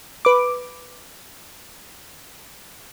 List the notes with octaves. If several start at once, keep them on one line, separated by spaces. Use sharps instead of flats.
B4 D6